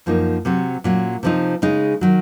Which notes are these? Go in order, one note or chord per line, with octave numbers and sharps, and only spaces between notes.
F#2 F3 A#3 D#4
C3 F#3 C4
A#2 F#3 C#4
C3 F3 C4 D#4
C#3 G#3 D#4
D#3 F#3